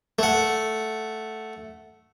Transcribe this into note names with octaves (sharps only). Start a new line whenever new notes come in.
A3 F#5